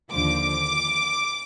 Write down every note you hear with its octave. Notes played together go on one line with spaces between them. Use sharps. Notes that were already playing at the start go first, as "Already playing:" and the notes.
D#2 D3 F3 D6